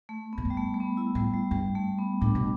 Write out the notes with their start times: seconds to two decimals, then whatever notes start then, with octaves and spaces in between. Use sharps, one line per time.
0.09 A3
0.33 A2 B3
0.45 G2
0.50 G3
0.57 A3
0.74 A3
0.80 B3
0.97 E4
1.15 A2 G3
1.33 G3
1.51 G2 G3
1.75 A3
1.98 B3
2.21 A2 D4
2.35 B2